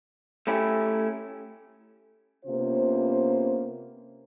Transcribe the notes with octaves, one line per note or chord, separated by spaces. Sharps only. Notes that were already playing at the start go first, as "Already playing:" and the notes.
A3 C#4 E4 G4
C3 A#3 B3 C#4 F4 C5